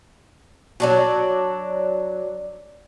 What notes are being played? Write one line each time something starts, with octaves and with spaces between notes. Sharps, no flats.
F#3 D4 F#4